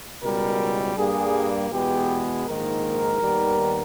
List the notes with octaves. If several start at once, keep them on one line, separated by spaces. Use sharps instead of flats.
C#2 B2 G3 A#4
G2 G3 A#3 G#4
E2 B2 G#3 B3 G4
A#1 G#2 D#3 A#3 A#4
D#2 D#3 G3 B3